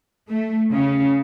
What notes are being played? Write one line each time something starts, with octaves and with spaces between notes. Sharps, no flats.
A3
C#3